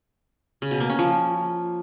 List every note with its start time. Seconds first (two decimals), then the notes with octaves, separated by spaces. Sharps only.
0.62 C#3
0.71 B2
0.80 A#3
0.90 C#4
0.99 F3